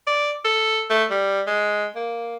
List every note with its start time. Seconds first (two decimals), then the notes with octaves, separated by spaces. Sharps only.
0.07 D5
0.45 A4
0.90 A3
1.10 G3
1.47 G#3
1.95 A#3